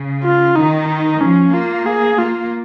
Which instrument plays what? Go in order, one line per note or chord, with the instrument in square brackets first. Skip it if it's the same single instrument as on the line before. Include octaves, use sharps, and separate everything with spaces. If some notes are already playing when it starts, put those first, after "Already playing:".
Already playing: [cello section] C#3
[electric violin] F4
[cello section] D#3 [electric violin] D#4
[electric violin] D#4
[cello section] F3 [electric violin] C#4
[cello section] A#3 [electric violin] F4
[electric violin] G#4
[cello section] A#3 [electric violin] F4